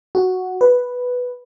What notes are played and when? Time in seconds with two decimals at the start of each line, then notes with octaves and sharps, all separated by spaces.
0.15 F#4
0.61 B4